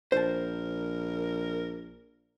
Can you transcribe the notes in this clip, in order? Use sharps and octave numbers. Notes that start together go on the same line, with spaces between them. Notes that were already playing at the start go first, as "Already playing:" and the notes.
A#1 A#4 C5 A5